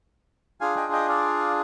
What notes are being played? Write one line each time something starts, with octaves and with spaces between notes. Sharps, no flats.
D4 F4 G#4 F5 G#5
D#5 G5
D#5 G5
D5 F5